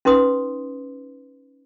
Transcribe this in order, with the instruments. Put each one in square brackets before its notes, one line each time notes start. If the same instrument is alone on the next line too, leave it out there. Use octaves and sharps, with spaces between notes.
[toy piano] C#4 D#4 B4 C6 D#6